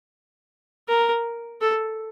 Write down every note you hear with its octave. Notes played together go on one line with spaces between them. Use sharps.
A#4
A4